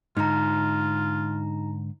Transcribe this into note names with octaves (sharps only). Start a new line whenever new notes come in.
G#2 D3 D#4 F4 A#5